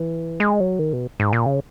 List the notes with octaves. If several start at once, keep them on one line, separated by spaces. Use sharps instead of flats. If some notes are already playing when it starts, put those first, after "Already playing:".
Already playing: E3
G#3
F#3
D#3
B2
G#2
A#2
C#3